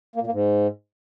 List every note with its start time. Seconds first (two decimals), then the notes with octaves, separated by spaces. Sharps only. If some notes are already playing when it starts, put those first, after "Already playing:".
0.16 A#3
0.21 A#2
0.27 A#3
0.32 G#2